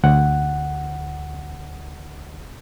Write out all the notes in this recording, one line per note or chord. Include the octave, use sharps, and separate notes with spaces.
D2 F#5